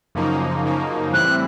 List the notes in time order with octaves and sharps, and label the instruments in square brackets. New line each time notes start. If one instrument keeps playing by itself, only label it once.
[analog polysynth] F#2 C#3 F3 A#3 D#4
F#2 C#3 F3 A#3 D#4
[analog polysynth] A2 E3 G3 C4 E4 [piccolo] F#6